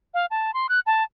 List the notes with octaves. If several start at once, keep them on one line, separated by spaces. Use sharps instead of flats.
F5
A5
C6
F#6
A5